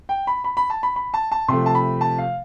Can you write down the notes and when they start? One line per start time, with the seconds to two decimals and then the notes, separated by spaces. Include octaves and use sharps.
0.09 G5
0.27 B5
0.44 B5
0.57 B5
0.70 A5
0.83 B5
0.96 B5
1.14 A5
1.31 A5
1.48 C3 F3 A3 C6
1.66 A5
1.75 B5
2.01 A5
2.18 F5